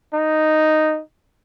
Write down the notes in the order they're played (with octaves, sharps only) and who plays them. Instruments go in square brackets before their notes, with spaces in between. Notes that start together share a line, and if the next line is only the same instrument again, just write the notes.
[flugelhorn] D#4